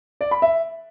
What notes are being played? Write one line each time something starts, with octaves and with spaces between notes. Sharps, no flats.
D5
B5
E5